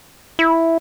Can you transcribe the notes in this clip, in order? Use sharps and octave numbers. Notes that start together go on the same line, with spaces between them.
E4